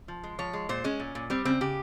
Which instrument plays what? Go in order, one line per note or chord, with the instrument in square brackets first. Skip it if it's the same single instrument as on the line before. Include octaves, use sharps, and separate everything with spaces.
[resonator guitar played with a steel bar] F3
G#3
F3 C#5
G#3
A#2 C5
G#3 C#4
A#2
A#2
G3 C4
C#3 C4
C#3 G4